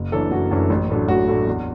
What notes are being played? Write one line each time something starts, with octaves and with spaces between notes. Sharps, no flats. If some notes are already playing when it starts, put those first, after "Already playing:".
Already playing: F#1
F#2 E3 A3 D4 A4
F#1 F#4
F#2 E3 A3 D4
A1
A2 F#3 A3 D4
A1 F#4
A2 F#3 A3 D4
E2